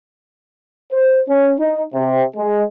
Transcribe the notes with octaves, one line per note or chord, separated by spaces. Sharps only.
C5
C#4
D#4
C3
G#3